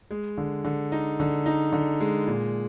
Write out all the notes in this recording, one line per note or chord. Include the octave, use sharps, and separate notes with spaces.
G#3
D3
D3
D#4
D3
D#4
D3
G#3
A#2